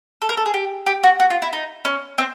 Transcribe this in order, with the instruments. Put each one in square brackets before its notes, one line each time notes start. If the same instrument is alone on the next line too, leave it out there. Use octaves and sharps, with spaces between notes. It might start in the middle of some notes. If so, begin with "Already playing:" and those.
[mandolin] A4
A#4
A4
G#4
G4
G4
F#4
F#4
F4
E4
D#4
C#4
C4